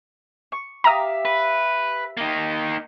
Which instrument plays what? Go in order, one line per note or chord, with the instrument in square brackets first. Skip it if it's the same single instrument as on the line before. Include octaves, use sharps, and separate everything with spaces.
[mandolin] C#6
[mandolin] G4 E5 F5 [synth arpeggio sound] A#5 D#6
[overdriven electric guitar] B4
A#3 D#4